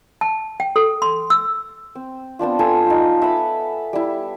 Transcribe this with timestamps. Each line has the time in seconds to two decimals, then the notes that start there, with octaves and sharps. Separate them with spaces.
0.21 A5
0.60 G5
0.76 A4
1.02 C6
1.30 E6
1.95 C4
2.39 B3 C4 D4 F4
2.59 B3 F4 A4 G#5
2.86 D#4 F4
3.22 E5 F#5 B5 D6
3.93 G3 E4